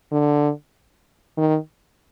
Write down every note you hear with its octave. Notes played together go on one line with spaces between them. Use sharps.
D3
D#3